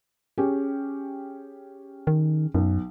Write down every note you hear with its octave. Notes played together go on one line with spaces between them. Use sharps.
C#4 G4 G#4
D#3
B1 F#2